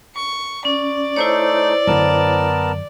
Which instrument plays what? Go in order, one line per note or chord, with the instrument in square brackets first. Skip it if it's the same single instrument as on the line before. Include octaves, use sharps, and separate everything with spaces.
[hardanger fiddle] C#6
[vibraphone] C#4 [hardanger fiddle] D5
[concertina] A3 D#4 [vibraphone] E4 C5 C#5
[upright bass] F#2 D3 [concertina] B3 A#4 A5